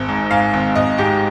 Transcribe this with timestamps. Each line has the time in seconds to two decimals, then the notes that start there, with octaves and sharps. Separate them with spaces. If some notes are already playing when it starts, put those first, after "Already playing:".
Already playing: G#1
0.08 G#2
0.31 G#2 F5
0.53 G#1
0.75 G#1 D#5
0.98 G#2 G4